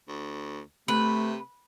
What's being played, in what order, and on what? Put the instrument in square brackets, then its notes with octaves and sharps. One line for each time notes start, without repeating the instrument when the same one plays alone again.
[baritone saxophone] D2
[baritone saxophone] C3 [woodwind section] A3 [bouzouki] B4